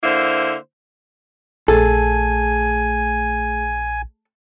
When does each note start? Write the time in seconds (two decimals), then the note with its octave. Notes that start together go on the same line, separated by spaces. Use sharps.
0.03 D3 A#3 E4 C5
1.68 A#1 A3 G#4 A4 G#5